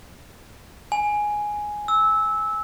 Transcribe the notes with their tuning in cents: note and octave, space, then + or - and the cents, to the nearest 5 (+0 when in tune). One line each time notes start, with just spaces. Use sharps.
G#5 +5
E6 -15